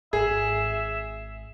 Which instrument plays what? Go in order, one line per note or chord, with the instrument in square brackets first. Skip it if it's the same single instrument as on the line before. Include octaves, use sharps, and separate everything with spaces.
[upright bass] G#1 [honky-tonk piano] G#4 [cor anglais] E5